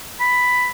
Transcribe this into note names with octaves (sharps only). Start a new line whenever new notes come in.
B5